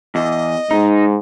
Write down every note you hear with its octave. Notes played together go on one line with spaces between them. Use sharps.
E2 D#5
G#2 D#4